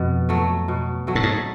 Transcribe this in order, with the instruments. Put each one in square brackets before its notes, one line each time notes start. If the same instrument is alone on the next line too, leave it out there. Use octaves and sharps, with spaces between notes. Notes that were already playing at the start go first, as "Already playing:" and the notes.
Already playing: [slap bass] F2 [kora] B2
[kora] F#3 A3
B2
F#3 A3
[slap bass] A2
G#2